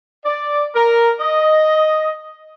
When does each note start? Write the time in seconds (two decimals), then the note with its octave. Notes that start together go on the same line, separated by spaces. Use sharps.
0.25 D5
0.75 A#4
1.19 D#5